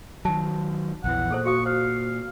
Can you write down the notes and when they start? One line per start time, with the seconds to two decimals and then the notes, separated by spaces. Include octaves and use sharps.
0.25 D#3 F#3 A5
1.04 A#1 E2 E3 F#5
1.31 A#2 G#4 A4 C5
1.45 F#4 F5 C#6 D#6
1.66 C5 F5